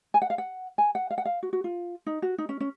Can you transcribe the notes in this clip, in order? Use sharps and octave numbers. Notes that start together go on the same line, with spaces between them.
G#5
F#5
F5
F#5
G#5
F#5
F5
F#5
F5
F#4
F#4
F4
D#4
F#4
D#4
C#4
C#4